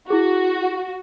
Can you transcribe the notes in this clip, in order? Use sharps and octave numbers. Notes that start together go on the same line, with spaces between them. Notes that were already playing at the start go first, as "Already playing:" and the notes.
E4 F#4 G#4